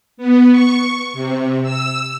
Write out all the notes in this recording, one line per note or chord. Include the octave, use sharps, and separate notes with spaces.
B3
C#6
C3
E6